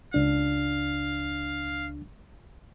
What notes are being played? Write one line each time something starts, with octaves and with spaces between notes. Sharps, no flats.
C#2 D4 F5